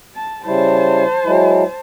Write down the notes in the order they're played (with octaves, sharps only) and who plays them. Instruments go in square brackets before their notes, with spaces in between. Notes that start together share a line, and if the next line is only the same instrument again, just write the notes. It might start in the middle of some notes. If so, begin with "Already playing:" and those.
[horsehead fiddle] A5
[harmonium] C#3 G3 E4 [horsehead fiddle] C5 A5
[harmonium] F#3 G#3 E4